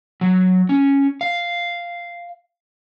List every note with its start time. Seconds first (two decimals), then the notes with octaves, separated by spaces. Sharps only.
0.21 F#3
0.69 C#4
1.21 F5